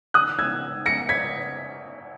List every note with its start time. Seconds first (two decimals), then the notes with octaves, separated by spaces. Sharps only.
0.14 D#6 F#6
0.39 E6 G#6
0.86 A#6 C#7
1.09 G#6 B6